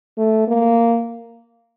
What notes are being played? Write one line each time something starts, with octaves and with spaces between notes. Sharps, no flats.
A3
A#3